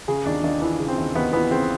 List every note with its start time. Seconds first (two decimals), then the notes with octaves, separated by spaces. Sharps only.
0.08 C#3 G#4
0.26 D#2 D4
0.44 D#2 D4
0.62 E3 D4
0.80 C#3
0.88 C4
0.98 D#2
1.15 D#2 B3
1.33 E3 B3
1.51 C#3 C4